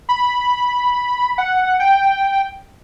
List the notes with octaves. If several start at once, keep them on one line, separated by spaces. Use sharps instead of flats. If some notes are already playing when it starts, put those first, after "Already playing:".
B5
F#5
G5